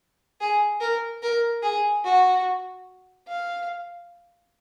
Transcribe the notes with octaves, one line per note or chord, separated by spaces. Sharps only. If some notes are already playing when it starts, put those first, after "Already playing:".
G#4
A#4
A#4
G#4
F#4
F5